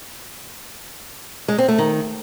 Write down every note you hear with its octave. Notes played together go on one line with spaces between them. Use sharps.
G#3
C4
A3
D#3